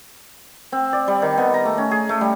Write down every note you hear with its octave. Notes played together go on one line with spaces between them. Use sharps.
C4
D5
G3
D#3
B3
A#5
A3
C#4
G#4
A3
G3